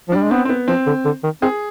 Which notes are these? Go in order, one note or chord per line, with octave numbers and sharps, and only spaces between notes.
F3
G3 D4
G#3
B3 C4
C4
B3
F3 C4
D3
D3
D#3
C4 G#4